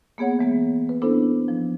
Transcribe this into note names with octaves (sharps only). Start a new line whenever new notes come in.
A#3 B3 G#4 C#5 F#5
E3 G#3 B3
B4
B3 C#4 D4 E4 A4 C5
F3